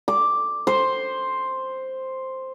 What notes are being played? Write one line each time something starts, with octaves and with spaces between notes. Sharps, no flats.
D6
C5